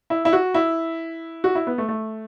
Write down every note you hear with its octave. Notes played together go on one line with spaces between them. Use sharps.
E4
E4
F#4
E4
F#4
E4
B3
A3
A3